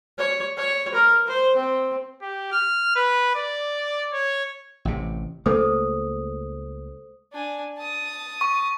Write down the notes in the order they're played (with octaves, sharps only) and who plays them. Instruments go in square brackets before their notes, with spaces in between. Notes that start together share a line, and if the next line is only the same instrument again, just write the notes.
[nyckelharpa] C#5
C#5
A#4
C5
C4
[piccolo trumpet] G4
F6
B4
D5
C#5
[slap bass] A1 C3
[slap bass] C#2 A3 A#3 [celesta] A4 C5 D#6
[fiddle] D4 G#5
A5 D#6
[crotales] C#6